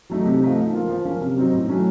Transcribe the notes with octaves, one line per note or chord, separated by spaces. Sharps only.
F#3 A3 D#4
C3
F3 A3 D#4
F3
A#3 F4
F3
A#3 C#4
C3
F#3 C4 D#4
A2
F#3 A3 C#4